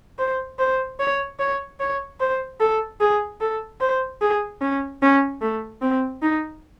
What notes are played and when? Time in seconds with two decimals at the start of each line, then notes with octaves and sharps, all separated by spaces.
0.19 C5
0.59 C5
1.00 C#5
1.40 C#5
1.80 C#5
2.20 C5
2.60 A4
3.01 G#4
3.41 A4
3.80 C5
4.21 G#4
4.62 C#4
5.02 C#4
5.41 A3
5.82 C4
6.22 D#4